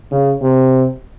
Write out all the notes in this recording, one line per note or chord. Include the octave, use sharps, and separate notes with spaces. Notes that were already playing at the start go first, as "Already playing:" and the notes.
C#3
C3